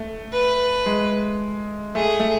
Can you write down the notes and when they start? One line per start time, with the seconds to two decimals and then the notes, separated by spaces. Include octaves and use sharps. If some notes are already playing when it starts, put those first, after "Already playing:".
Already playing: A3
0.32 B4
0.86 G#3
1.95 A3 G#4
2.20 A3